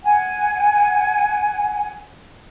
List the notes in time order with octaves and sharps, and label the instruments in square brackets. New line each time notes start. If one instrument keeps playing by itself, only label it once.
[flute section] F#5 G#5